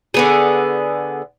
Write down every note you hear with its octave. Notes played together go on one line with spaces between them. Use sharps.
D3 B3 G#4